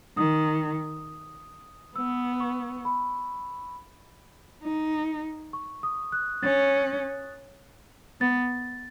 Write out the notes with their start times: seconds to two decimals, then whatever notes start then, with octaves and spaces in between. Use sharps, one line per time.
0.17 D#3 D#6
1.96 B3 E6
2.40 C#6
2.85 B5
4.64 D#4
5.53 C#6
5.83 D#6
6.12 F#6
6.43 C#4 A6
8.21 B3 A6